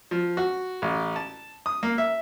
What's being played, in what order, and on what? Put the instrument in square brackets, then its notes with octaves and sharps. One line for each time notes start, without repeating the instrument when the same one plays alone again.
[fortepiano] F3
F#4
A1
A5
D#6
A#3
E5